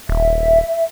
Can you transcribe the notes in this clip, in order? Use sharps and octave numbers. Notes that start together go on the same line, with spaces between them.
D#1 E5